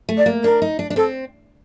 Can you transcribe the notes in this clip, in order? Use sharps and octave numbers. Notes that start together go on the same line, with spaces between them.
A3
D5
A#3
D4 A#4
D#4
D4
D4
C4 A4